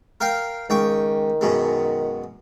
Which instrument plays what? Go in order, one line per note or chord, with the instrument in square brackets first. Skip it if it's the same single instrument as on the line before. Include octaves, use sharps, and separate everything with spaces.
[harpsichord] A#4 F5 G5
[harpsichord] C#2 G5 C#6 [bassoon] D#3
[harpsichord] F#2 B2 G#3